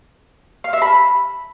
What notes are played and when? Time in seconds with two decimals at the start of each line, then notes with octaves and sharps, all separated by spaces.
0.64 F5
0.73 E5
0.82 B5